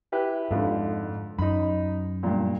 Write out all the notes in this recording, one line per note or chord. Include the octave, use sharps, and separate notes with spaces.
E4 G4 B4
F2 G#2 D3
F#2 D#4 B5
G2 A#2